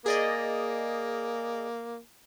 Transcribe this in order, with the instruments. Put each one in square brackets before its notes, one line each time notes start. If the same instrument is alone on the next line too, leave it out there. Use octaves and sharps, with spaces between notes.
[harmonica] A#3 [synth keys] G#4 D5 D#5